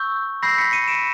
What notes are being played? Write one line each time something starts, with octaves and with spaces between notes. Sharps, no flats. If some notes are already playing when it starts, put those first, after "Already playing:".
Already playing: C#6 E6 G6
B5 E6 G6 A#6 C7
B6 C#7
C#7 D#7
D7 E7